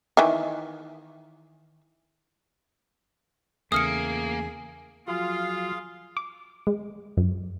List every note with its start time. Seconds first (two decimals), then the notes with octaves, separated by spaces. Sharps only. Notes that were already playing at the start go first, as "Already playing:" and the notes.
0.17 D#3 E3
3.72 E2 C#3 A3 A#3 G#4 D#6 F6 C#7
5.08 F3 F#3 F4 F#4 G#4 F5
6.17 D6
6.67 G#3
7.17 F#2